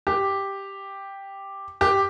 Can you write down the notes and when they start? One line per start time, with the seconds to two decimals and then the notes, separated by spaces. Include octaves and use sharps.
0.07 G4
1.81 G4